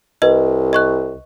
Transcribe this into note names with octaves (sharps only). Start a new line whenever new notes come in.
C2 B4 D#5
D#5 C#6 F#6